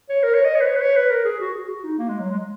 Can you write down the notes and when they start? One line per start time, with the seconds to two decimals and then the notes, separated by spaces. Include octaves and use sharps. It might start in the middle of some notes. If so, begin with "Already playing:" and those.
0.09 C#5
0.23 A#4
0.35 C#5
0.45 D#5
0.56 C#5
0.61 B4
0.67 C#5
0.76 B4
0.82 C#5
0.97 B4
1.11 A#4
1.25 G#4
1.40 F#4
1.54 G#4
1.69 F#4
1.84 D#4
1.99 A#3
2.09 G#3
2.20 F#3
2.31 G#3